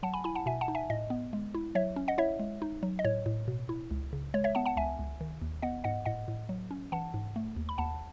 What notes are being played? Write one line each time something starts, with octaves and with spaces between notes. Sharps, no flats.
F#3 F#5 A5
G#5 B5
E4 G#5 B5
F#5 A5
B2 E5 G#5
F#5 A5
D#4
E5 G#5
A2 D#5
B3
G#3
E4
F#3 C#5 E5
C#4
D#5 F#5
E4 C#5 E5
G#3
D#4
F#3
D#5
A2 C#5
A2
B2
E4
C#2
C#3
G#3 C#5
C#5 E5
B3 F#5 A5
F#5 A5
C#2 E5 G#5
C#2
D#3
D#2
B3 D#5 F#5
G#2 D#5 F#5
A2 D#5 F#5
A2
F#3
C#4
E3 F#5 A5
G#2
A3
D#2
B5
D#2 F#5 A5